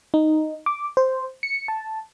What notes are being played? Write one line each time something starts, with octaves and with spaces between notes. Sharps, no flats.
D#4
D6
C5
C#7
A5